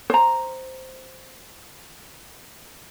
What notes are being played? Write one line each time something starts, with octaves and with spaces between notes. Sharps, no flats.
C5 A#5